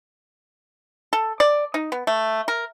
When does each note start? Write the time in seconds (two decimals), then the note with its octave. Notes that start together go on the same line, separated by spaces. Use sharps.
1.13 A4
1.40 D5
1.74 D#4
1.92 B3
2.07 A3
2.48 A#4